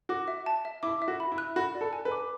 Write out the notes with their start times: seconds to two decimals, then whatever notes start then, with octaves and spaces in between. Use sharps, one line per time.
0.09 F#4 D6
0.28 E5
0.46 A5
0.65 E5
0.83 E4 D6
1.02 E5
1.08 F#4
1.20 B5
1.32 E4
1.38 F#6
1.56 F#4 B5
1.75 D5
1.81 A4
1.93 G#5
2.05 B4
2.12 D6